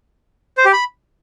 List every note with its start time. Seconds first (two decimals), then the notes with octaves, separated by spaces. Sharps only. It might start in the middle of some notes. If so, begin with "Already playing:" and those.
0.57 C5
0.65 G4
0.73 B5